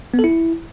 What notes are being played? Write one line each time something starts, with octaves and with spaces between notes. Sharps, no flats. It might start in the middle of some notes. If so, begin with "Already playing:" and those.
B3
A4
E4